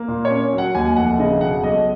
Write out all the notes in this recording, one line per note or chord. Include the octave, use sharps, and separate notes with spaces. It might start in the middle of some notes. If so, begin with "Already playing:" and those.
Already playing: A#3
A#2
C#5
C#4
F#3
F#5
D#2 G#5
F1 F#5
C#3 D#5
B2 F#5
B1 D#5